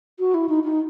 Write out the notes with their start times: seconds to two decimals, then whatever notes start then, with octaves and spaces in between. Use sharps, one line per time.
0.19 F#4
0.34 E4
0.49 D#4
0.64 D#4